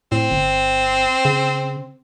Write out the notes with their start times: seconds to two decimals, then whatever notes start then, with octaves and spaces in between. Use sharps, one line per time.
0.12 A2 C4
0.32 G1
1.25 C#3